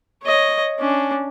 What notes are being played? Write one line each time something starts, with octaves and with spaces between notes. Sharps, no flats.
C#5 D#5
C#4 D4